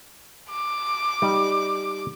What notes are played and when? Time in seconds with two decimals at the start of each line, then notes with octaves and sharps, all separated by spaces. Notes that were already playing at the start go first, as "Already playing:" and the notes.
0.51 D6
1.22 G3 D#4